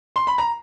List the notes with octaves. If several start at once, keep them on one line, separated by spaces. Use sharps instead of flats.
C6
B5
A#5